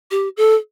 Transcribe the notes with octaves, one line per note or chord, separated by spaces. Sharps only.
G4
A4